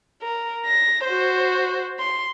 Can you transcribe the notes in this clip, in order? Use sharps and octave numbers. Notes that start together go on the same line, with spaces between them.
A#4
A#6
F#4 C5
C6